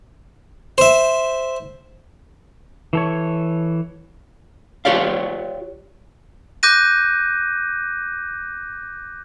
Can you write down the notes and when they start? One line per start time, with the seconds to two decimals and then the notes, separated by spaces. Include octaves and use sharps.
0.78 C5 E5
2.93 E3 A4 C#5
4.85 F4 G4 C#5 D5 F5
6.63 D6 F#6 G6 A#6 D#7